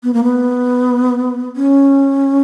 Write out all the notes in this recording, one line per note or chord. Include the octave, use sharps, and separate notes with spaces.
B3
A#3
B3
C#4